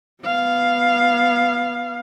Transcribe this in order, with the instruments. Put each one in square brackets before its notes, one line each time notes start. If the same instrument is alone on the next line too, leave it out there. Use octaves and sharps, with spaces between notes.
[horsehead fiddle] B3 F5